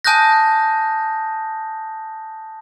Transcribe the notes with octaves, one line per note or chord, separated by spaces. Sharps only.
G#5 A5 D#6 F#6 G6 A#6